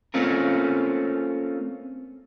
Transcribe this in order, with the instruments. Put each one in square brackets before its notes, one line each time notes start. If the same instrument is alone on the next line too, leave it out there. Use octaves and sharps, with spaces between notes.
[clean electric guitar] A3 A#3 C4 C#4 F4 A#4